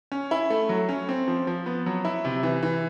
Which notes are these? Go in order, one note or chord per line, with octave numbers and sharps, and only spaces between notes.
C#4
E4
A3
F#3
C#4
C4
F3
F3
B3
F#3
E4
C3
E3
E3